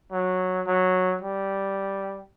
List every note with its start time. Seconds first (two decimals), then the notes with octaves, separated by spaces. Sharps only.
0.12 F#3
0.67 F#3
1.21 G3